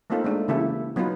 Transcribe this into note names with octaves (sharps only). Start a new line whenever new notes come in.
A3 A#3 C4 D#4 F4 A4
G#3 A3 D4
C#3 E3 A#3 E4 G4 A4
F#3 B3 D#4 F4 B4